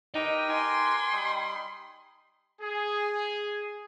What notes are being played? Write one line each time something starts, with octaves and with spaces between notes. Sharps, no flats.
D#4 G4 A#4 B4 G5
G#5 C6
G3 D#4 D#6
G#4